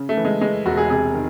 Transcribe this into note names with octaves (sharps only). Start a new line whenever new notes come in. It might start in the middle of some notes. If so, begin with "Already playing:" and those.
Already playing: C#3
A3
E3
G#3
E3 G#3
E1 F#4
G#4
C3 G#4
D#3